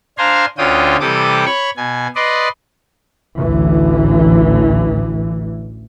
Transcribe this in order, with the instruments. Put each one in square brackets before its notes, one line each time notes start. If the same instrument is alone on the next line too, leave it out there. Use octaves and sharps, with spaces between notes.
[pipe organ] D4 C5 F5 G#5 A#5 C6
D2 D3 C#4 F4 G5 D#6
C3 E3 G3 A4 D6 D#6
C#5 B5 C#6
B2 G#5
B4 D5 D#5 C6
[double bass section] A1 D2 E3